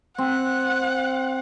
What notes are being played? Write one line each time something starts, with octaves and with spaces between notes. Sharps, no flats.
C4 F#5